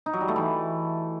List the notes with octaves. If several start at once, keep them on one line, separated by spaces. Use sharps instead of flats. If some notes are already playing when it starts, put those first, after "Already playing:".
D#4
F#3
G3
A3
E3